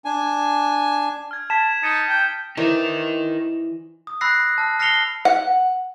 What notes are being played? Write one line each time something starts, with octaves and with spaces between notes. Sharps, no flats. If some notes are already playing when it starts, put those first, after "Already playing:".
D4 G#5
F6 G#6
A5 G#6 B6 E7
D#4 A6 C#7 D#7
G5
E3 D#4 A#4 C5 D5
D#6
B5 E6 F#6 A#6 C7
A5 F6
F6 A#6 C7 C#7 F7 G7
F#5